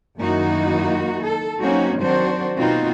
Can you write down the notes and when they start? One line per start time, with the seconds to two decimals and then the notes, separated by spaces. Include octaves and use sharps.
0.18 F#2 D#3 A#3 D#4 E4 F#4
1.23 A4
1.61 F#3 A#3 C4 C#4 D#4 F#4
2.01 D#3 F#3 C4 D4 F#4 C5
2.58 B2 A#3 C4 D#4 F4 F#4